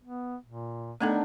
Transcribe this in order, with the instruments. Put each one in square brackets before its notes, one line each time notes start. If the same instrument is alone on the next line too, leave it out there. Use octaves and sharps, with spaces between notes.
[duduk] B3
A#2
[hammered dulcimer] D3 D#3 D4 [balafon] A3 B3 A4